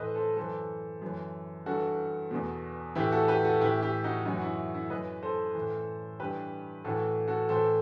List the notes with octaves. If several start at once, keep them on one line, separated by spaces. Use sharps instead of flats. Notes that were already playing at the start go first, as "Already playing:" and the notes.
Already playing: A2 E3 A4 B4 C5 D#5
A4 C5
F#2 E3 A4 C5
F#2 E3
G2 E3 F#4 A4
E2 B2
A2 E3 E4 G4
F#4 A4
G4 B4
F#4 A4
A2 E3 E4 G4
E4 G4
D#4 F#4
F#2 E3 D#4
F#4
E4
E4
F#2 E3 B4 D#5
A4 C5
A2 E3
G2 E3 G4 B4
A2 E3 F#4 A4
F#4 A4
A2 E3 A4 C5